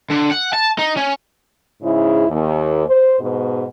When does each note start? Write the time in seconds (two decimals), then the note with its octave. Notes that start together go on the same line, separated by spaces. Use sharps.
0.10 D3
0.31 F#5
0.53 A5
0.79 D#4
0.97 C#4
1.82 G#2 C#3 E4
2.29 D#2
2.87 C5
3.19 G#2 B2